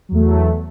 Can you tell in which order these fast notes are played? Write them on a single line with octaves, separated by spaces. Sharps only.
F#3 E2 A3